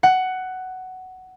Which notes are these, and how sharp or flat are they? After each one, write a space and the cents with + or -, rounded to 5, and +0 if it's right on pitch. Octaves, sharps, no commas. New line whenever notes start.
F#5 +10